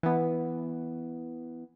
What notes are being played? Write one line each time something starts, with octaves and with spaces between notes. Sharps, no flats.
E3 B3